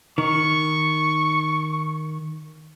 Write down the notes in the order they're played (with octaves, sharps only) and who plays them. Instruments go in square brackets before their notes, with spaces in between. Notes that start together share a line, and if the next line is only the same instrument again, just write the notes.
[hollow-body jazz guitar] D#3 [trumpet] C#6